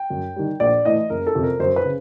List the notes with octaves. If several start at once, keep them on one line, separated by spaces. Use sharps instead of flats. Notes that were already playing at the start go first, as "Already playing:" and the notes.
Already playing: G5
F#2
D#3 G3
A#1 D5
A2 E3 D#5
F#1 A#4
A4
F2 C3
A#4
F#2 C5
B4
C#3